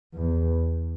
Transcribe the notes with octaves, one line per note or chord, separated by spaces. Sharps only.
E2